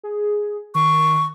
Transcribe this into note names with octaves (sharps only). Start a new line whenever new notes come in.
G#4
D#3 C#6